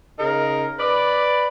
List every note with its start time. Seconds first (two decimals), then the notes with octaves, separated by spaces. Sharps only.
0.18 C#3 D#4 G#4 A#4
0.79 B4 D5